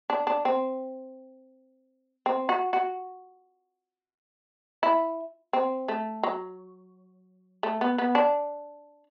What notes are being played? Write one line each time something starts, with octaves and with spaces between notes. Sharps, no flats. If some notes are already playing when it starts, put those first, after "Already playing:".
D4
D4
C4
C4
F#4
F#4
E4
C4
A3
F#3
A3
B3
B3
D4